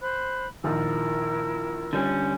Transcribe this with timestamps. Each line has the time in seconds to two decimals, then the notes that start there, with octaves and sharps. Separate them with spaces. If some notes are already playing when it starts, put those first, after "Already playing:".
0.01 C5 B5 F#6
0.64 A#1 D#3 F3 E4 A#4 E6
1.93 D3 G3 C#4